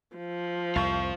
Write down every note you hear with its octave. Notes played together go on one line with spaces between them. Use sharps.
F3
C2 F2 C5 F5 C#6